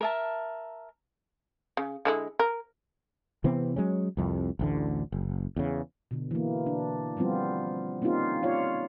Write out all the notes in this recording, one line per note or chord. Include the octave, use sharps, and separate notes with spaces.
A#4 E5 A5
C#3
D3 G#3 E4
A#4
C3 E3 B3 C4
F#3 G#3 C#4
C2 F2
A1 D2 D3
F#1
E2 C#3
B2 D3
E3 A#3
D4
F3 G3 B3 C4 F4
A#3 C4 C#4 D#4 F4 G4
F4 C#5 D5 F5